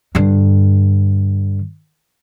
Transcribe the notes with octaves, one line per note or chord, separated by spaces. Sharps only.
G2 D3